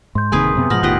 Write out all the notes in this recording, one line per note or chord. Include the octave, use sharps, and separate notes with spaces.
G#2 C6 G6
D1 C3 D#3 A#3 G#4 B4 G#5 D#6
F#2 C3 B3
G#2 B2 F3 B3 F6 A#6 F#7
E1 A2 D#3 F4 G4 D#5 F#6 B6